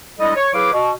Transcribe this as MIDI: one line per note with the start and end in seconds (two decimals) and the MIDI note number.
0.19 0.32 55
0.19 0.32 56
0.19 0.32 62
0.19 0.32 64
0.19 0.32 69
0.19 0.32 75
0.35 0.52 73
0.53 0.71 54
0.53 0.71 64
0.53 0.71 68
0.53 0.71 71
0.53 0.71 77
0.53 0.71 86
0.72 0.89 47